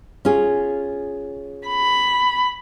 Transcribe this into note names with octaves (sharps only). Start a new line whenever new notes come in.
C#4 F4 G#4
B5